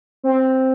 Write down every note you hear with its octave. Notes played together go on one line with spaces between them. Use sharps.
C4